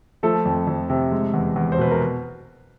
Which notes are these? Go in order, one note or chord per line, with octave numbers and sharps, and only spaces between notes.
F3 A3 A4
F2
F2
C3
G#3
E2
E2
C5
B2 B4
A#4